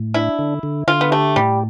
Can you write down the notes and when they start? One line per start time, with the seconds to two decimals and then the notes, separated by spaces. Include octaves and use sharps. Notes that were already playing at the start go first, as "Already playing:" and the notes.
Already playing: A2
0.14 D4 E4
0.39 D3
0.63 D3
0.88 D3 F4
1.01 B3
1.11 A3 G4
1.36 A2 G3